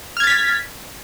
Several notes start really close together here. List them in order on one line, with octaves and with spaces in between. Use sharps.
F6 G#6 A6 B6